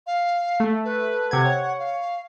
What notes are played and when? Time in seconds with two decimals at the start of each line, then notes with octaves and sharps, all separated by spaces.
0.07 F5
0.60 A3
0.85 B4
1.31 C3 F#5 G#6
1.45 C#5
1.79 F5